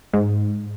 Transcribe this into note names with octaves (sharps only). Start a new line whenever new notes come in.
G#2